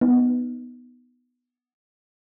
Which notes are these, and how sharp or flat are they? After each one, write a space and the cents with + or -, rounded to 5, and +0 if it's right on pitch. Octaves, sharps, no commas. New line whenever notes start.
B3 +0 D#4 +0